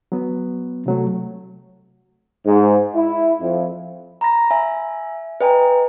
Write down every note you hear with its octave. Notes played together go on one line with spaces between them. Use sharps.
F#3 B3
C3 F#3 A3
G#2
E4
F2
A#5 B5 A#6
E5 G#5
B4 D#5 G5 G#5 A#5